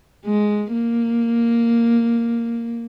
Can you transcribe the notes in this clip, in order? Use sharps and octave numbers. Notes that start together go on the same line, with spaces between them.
G#3
A#3